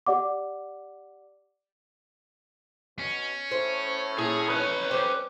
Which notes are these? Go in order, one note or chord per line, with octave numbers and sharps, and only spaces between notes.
G4 D5 F#5 D6
B2 C#4
A2 C5
A#2 E4 G#4
B4 C#5
G3 G4 C5